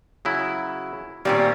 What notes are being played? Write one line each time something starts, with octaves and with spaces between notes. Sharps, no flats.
C#3 F#3 E4
A#2 D#3 G3 A#3 C4 C#4